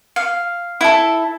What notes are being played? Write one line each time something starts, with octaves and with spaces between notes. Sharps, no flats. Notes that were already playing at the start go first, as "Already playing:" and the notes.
F5
E4 A4